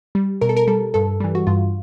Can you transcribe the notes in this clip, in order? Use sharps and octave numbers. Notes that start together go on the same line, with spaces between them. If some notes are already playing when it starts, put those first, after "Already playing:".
G3
B2 A#4
A4
A#4
G3 A4
G2 A4
E3 G3
F#4
G2 F4